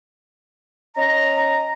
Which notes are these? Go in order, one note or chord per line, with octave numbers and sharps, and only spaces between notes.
C#4 D#5 A#5